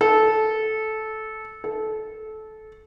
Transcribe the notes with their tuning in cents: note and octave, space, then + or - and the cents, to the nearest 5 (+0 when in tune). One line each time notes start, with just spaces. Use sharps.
A4 -15
A4 -20